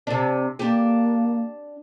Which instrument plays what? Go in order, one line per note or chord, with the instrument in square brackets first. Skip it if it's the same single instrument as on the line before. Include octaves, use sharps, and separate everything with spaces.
[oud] C3 D4
[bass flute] A#3 [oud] D4 G4